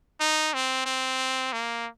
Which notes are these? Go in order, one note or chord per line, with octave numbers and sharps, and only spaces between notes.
D#4
C4
C4
A#3